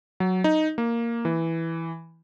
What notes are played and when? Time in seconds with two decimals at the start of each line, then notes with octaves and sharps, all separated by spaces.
0.20 F#3
0.44 D#4
0.78 A#3
1.25 E3